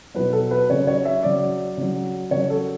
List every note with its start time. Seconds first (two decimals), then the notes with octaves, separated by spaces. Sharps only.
0.14 B2 F#3 B4
0.33 A4
0.51 B4
0.70 C#3 F#3 C#5
0.87 C#5
1.05 E5
1.23 C#3 F#3 D5
1.77 C#3 F#3
2.31 C#3 F#3 C#5
2.50 A4